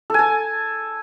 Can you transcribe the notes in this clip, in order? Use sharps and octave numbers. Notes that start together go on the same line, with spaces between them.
A4 G#5 A5